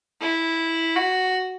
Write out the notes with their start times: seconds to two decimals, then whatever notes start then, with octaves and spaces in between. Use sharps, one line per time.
0.21 E4
0.95 F#4